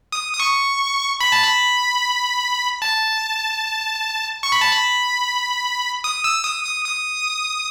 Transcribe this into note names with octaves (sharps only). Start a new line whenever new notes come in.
D#6
D#6
C#6
B5
A5
B5
A5
C#6
B5
A5
B5
D#6
E6
D#6
D#6
D#6